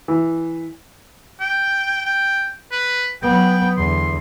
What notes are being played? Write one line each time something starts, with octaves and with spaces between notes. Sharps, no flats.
E3
G5
G5
B4
F#3 B3 G5
E2 D3 C6